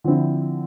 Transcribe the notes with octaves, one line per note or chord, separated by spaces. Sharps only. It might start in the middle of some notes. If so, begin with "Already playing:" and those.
D3 F3 C4 E4